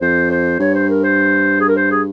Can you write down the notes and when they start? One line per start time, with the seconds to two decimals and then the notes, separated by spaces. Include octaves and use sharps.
0.01 F2 C5
0.31 C5
0.60 G2 C#5
0.74 C5
0.89 A#4
1.03 C5
1.60 G#4
1.68 A#4
1.77 C5
1.91 G#4